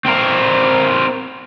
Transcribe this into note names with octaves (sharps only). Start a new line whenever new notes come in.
C4 A#4